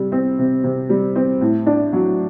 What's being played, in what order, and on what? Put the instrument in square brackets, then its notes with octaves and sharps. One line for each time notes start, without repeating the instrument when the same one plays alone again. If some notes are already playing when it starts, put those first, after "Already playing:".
Already playing: [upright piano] C3 G3
C4
C3
C3
G3
C4
A2
D4
F#3